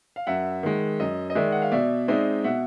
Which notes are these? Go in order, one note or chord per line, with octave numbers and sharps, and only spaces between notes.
F5
F#2 E5 F#5
D#3 G#3
F#2 D#5
D#5
D#3 G#3 D5 E5
F#5
F5
B2 D5 E5
G#3 C4 D#4 D5 E5
B2 E5 F#5